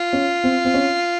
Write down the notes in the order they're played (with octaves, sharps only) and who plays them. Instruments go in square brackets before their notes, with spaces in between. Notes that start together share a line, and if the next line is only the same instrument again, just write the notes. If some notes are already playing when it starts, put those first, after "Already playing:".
Already playing: [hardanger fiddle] F4
[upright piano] C#4
C4
C4
C#4